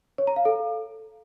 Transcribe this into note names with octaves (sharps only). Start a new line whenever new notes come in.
C#5
A#5
F5
A4